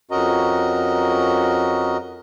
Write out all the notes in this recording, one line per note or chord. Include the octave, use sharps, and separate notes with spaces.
F2 C#4 F#4 A#4 D#5 A#5